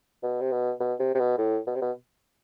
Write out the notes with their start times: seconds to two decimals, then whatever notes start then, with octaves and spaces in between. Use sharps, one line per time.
0.23 B2
0.41 C3
0.52 B2
0.80 B2
1.00 C3
1.15 C3
1.19 B2
1.38 A2
1.67 B2
1.75 C3
1.82 B2